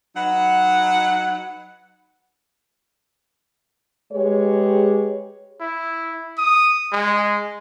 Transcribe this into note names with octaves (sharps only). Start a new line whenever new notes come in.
F#3 D#4 B4 F#5
G#3 G4 G#4 B4 C#5
E4
D#6
G#3